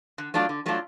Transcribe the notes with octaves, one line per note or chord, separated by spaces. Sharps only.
D3
F#3 A3 D4 F4
D3
F#3 A3 D4 F4